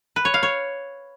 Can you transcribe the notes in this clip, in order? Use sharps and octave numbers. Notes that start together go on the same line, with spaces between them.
B4
C#5
F5
C#5